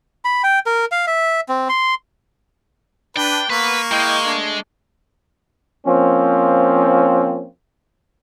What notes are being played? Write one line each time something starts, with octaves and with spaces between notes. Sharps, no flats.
B5
G5
A#4
F5
E5
C4
C6
D4 B4 G5
A#3 B3 B4 C#6
G#3 E4 D#5 G5
A3 D4
F3 A#3 C4 C#4